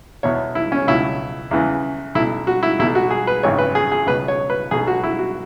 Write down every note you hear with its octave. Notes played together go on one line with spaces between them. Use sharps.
E2 B2 C#5
E4
C#4
C#2 B2 E4
E2 C#3 E3
B1 E4
B2
F#4
E4
B1 B2 E4
F#4
G#4
B4
G#1 F#2 C#3 E3 C#5
B4
G#4
G#4
C#2 B2 B4
C#5
B4
B1 B2 G#4
F#4
E4
F#4